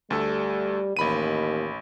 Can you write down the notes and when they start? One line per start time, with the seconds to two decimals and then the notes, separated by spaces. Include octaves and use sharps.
0.10 D2 G3 A3 A4
0.97 A1 D#2 B5 D#7